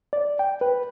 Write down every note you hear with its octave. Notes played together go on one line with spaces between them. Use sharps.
D5
G5
B4